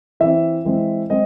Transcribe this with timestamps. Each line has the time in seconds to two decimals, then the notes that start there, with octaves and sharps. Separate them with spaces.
0.20 E3 C4 E5
0.65 E3 G#3 C4
1.10 G#3 C4 D#5